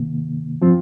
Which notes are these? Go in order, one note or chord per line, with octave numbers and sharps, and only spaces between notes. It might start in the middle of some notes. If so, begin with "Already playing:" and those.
Already playing: C3 D#3 A#3
F3 C4 F4